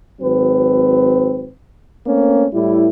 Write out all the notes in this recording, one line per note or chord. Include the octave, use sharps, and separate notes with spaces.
G#1 F#3 C4 B4
A3 A#3 C4 C#4
A2 G3 E4